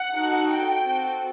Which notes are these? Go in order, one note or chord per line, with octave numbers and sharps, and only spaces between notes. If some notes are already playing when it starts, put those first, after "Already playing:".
Already playing: F#5
D#4 F#4 A4
G5
C4 F#4 A4